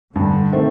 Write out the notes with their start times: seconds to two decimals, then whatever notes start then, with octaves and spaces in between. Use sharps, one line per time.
0.15 G2 D3
0.52 D#3 A3 C4